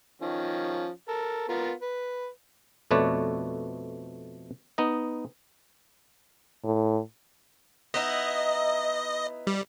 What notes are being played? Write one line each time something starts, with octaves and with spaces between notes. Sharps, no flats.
D#3 F3 C#4
A4 A#4
B3 F4 A#4
B4
F2 B2 A3 B4 C#5 D5
B3 D#4 D#5
A2
B3 D#4 E4 D#5
G3